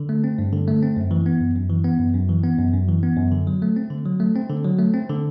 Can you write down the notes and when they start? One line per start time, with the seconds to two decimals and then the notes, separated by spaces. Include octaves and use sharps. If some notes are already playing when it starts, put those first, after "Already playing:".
Already playing: D3
0.09 A3
0.24 C4
0.38 G2
0.53 D3
0.68 A3
0.83 C4
0.96 F#2
1.11 E3
1.26 B3
1.40 F#2
1.56 F#2
1.70 E3
1.85 B3
1.99 F#2
2.14 F#2
2.29 E3
2.43 B3
2.59 F#2
2.74 F#2
2.88 E3
3.03 B3
3.17 F#2
3.32 D3
3.47 F#3
3.62 A3
3.76 C4
3.90 D3
4.06 F#3
4.20 A3
4.35 C4
4.49 D3
4.64 F#3
4.79 A3
4.94 C4
5.09 D3